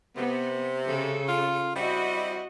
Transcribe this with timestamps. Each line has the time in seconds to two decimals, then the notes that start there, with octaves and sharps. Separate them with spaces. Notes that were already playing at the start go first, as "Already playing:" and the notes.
0.16 C3 B3
0.84 C#3 A4
1.29 F4
1.76 G3 C4 E4 F#4 D#5